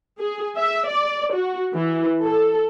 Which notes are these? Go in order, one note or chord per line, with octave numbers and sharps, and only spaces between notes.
G#4
E5
D5
F#4
E3
A4